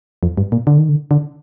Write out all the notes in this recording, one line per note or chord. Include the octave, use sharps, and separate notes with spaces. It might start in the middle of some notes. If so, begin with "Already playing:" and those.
F2
G2
A#2
D3
D#3
D3
D3